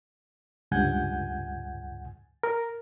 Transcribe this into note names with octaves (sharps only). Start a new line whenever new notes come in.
C#2 G2 F#5 G#5 G6 G#6
A#4